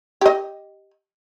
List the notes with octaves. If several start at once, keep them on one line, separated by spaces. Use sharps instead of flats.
G4 D#5